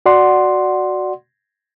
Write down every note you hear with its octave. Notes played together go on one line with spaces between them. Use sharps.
F#4 D5 F#5 C6